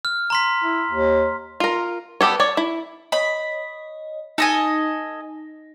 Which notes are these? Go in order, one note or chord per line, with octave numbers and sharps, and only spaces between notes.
F6
A#5 C6 B6
E4
D#2
F4 A#4
B3 G4 A4 C#5
C#5 D5
E4
C#5 D#5 B5
D#4 A4 D#5 G#5